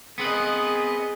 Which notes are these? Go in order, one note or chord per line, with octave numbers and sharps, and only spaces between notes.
B3 C4 G#4 B4 D#5